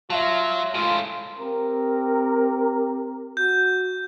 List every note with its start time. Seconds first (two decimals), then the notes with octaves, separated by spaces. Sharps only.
0.10 F#3 F4 E5 F5 A5
0.74 A2 G#3 F4
1.39 C4 G4 A#4
3.37 F#4 G6